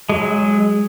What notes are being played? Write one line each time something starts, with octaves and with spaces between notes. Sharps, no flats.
F#3 G#3